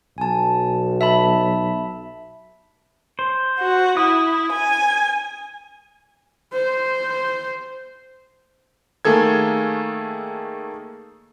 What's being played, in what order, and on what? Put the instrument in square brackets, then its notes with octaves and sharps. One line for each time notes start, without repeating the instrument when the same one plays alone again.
[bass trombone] B1 [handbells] G#5 A5
[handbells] E5 A5 B5
[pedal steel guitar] C5
[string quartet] F#4
[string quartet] E4 [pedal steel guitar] D#6
[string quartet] G#5
[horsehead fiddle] C5
[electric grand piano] D#3 A3 A#3 G#4 A4 G#6